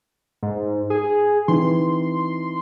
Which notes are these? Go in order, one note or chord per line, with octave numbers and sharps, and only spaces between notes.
G#2
G#4
E3 C4 D#4 C6